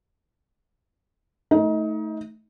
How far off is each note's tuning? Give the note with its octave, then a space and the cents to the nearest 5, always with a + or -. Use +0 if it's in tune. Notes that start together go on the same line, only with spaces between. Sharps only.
A3 +0 D#4 +25